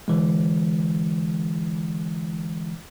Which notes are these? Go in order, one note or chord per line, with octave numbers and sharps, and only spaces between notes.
D3 E3 G#3